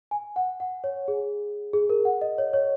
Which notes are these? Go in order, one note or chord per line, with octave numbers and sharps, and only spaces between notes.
G#5
F#5
F#5
C#5
G#4
G#4
A#4
F#5
D#5
C#5
C#5